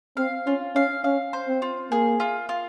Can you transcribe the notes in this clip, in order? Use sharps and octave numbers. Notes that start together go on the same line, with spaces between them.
C4 F5
C#4 F4
C#4 F5
C#4 F5
C5
C4
F4
A#3 G#4
F4
F4